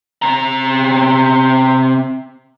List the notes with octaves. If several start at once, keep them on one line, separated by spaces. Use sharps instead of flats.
C3 A#5